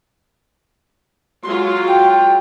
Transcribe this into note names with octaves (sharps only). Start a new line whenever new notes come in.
F#3 G#3 F4 C6
G5